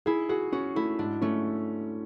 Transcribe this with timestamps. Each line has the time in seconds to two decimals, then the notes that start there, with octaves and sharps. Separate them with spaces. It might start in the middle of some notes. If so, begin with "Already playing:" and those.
0.06 E4 G#4
0.29 F#4 G#4
0.52 C#4 F#4
0.76 A3 E4
0.99 G#2 D4
1.22 A3 C#4